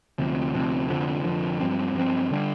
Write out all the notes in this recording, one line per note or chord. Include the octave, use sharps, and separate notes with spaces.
D2 C3 F3
D2 C3 F3
F1 F2 D3 F3
F1 F2 D3 F3
G2 F3 C4
G2 F3 C4
D3 G3 D4